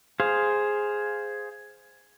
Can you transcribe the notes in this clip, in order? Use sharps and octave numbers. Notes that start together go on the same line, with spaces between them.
G#4 C5 F5